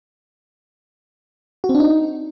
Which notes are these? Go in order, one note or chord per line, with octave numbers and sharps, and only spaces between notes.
F#4
C4
D4
D#4